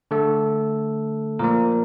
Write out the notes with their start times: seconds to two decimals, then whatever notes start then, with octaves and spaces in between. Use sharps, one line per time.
0.11 D3 A3 A4
1.39 A#2 F3 A#3 A#4